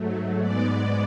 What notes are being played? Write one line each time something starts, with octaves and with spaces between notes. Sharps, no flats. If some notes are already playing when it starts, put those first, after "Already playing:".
Already playing: G#2 F#3 A3
G#2 G#3 B3 D5